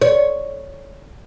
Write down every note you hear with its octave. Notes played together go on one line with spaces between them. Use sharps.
C#5